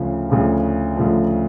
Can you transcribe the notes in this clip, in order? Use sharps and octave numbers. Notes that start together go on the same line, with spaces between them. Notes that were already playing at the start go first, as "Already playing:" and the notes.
Already playing: D2 C#3 F3
D2 C#3 F3
D2 C#3 F3